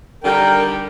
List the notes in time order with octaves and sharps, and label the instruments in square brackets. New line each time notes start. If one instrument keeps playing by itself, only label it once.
[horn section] D3 D#3 G3 [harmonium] A#4 G5